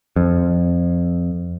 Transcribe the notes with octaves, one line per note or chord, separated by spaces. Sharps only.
F2